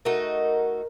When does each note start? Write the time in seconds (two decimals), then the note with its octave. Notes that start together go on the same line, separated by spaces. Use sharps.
0.05 A3 D#4 F#4 A#4